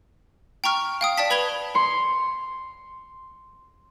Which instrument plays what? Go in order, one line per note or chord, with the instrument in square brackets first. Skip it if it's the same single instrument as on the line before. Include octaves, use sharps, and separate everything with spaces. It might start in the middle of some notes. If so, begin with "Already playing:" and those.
[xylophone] G5 A#5 C#6 F6
F5 G5 D#6
D5 G5 A5 B6
B4 B5 G#6 F7 G7
[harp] C6 C#7